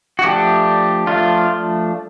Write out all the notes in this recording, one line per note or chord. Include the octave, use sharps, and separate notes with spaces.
F#4
F3 A3 D4 G4
F3 A3 D4 F4